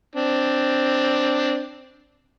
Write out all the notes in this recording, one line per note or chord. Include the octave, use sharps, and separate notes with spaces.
C4 D4